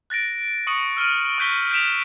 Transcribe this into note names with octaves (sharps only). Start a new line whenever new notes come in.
F#6 A6 A#6 D7
C#6 D#6 C#7 F#7
E6 F6 D7 D#7
C#6 F#6 G6 B6 G7
G6 B6 D7 E7 F7